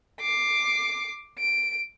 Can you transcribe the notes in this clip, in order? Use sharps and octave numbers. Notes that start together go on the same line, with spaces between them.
D6 C7
D7